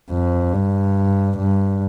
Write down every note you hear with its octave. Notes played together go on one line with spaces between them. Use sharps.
F2
G2
G2